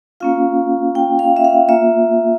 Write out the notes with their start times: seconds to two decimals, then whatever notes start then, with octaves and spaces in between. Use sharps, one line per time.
0.20 A#3 C#4 F4 F5
0.95 G5
1.19 F5
1.36 E5
1.44 F5
1.69 A#3 F4 E5